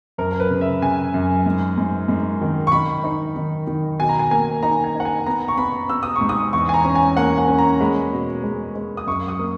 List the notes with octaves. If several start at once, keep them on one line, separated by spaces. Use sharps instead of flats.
F#2 A#4
A#4
B4
C#3
E5
C#3 G#5
F#2
G#2
G#2
G#2
D#3
C#6
D#3 B5
D#4
D#3
D#3
B2 G#5
A#5
G#5
A#3 G#5
D#4 A#5
G#5
D#4
F#5
G#5
B3 A#5
C#6
B3 B5
B3 E6
D#6
C#6
G#2
D#6
E2 C#6
G#5
A#5
C#4
G#5
A#3 F#5
F#5
C#4
A#5
G#3 B5
B2
G#3
G#3
D#6
F#2 C#6
D#6
A#3